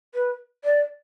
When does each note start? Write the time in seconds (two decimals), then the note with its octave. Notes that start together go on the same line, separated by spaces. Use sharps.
0.14 B4
0.64 D5